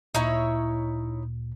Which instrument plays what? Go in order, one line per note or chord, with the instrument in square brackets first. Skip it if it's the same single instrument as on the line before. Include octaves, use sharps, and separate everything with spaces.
[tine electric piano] D2 A#2 [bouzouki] D#4 E4 C#5